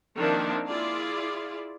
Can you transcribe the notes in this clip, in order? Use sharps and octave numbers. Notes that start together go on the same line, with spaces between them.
D#3 F3 A#3 C4 D4 E4
E4 F4 G#4 D5